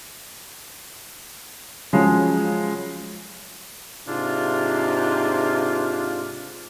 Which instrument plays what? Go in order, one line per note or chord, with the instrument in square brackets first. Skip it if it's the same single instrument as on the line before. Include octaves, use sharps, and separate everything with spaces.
[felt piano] C#3 F3 F#3 G#3
[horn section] G#2 C3 D4 F4